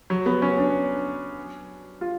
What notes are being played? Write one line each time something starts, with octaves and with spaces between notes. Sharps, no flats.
F#3
B3
C#4
D4
F4